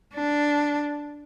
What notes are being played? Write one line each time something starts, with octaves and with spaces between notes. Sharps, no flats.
D4